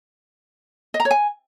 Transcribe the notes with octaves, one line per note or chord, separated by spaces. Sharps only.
D#5
A#5
C#5
G#5